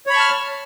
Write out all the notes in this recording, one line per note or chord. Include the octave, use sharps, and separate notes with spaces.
C#5 A5 B5 C#6 F6